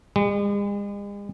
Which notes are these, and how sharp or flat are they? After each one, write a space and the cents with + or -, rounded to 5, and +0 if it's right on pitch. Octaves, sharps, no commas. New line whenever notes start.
G#3 -45